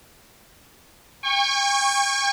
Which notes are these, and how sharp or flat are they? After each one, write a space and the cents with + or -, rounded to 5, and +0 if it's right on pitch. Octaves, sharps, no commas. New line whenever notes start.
G5 +45 C#6 -5